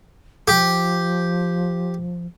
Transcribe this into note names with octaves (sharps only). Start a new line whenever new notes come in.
F3 G4